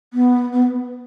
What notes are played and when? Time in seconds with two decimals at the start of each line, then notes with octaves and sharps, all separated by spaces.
0.14 B3
0.53 B3